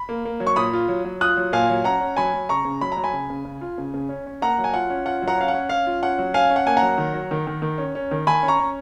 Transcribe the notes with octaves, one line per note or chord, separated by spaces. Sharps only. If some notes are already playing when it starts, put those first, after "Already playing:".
Already playing: B5
A#3
A#3
F#3
C#6
A#2 B5 D#6
F4
F#3
F#3
F4 D#6 F#6
F#3
A#2 F5 G#5
F#3
C#4 F#5 A#5
C#4
F#3 G#5 B5
F#3
C#3 A#5 C#6
C#3
F#3 B5
A#5
F#3
G#5 B5
C#3
C#3
C#3
F4
C#3
C#3
C#4
C#4
A#3 F#5 A#5
F#3
G#5
F4 F#5
C#4
F4 F#5
F#3
F#5 A#5
C#4 F5
F#5
C#4
C#4 F5
F4
C#4 F#5
F#3
C#4 F5 G#5
C#4
F#5
A#3 G#5
F#5 A#5
F#3
D#3
F#3
D#3
D#3
D#3
C#4
C#4
D#3
D#3 G#5 B5
C#4
A#5 C#6
C#4